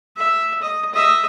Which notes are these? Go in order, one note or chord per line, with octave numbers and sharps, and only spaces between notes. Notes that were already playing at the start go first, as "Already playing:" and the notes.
E5
D#5
D#5 E5